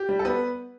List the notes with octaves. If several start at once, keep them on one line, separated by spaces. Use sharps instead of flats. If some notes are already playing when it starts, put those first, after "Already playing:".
Already playing: G4
G3
A4
B3 B4